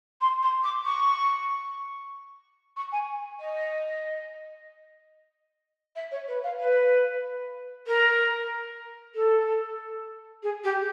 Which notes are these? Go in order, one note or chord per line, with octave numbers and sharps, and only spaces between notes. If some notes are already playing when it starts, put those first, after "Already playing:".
C6
C6
D6
C#6
C#6
G#5
D#5
E5
C#5
B4
F5
B4
A#4
A4
G#4
G4